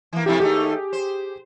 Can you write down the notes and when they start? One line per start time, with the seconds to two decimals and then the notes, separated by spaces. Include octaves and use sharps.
0.13 E3 A#3
0.26 C3 F3 A3 E4 G4
0.40 D#2 A3 D#4 G4 G#4
0.93 C5